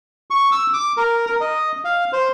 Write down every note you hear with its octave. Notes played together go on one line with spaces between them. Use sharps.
C#6
E6
D6
A#4
A#4
D#5
F5
C5